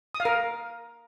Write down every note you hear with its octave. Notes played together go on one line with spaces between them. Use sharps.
D#6
F5
A#4